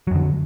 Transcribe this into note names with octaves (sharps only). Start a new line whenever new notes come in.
F2 D3 F#3